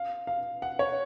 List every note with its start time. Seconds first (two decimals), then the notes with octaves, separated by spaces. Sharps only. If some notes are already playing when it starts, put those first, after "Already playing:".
Already playing: F5
0.27 F5
0.62 F#5
0.79 C#5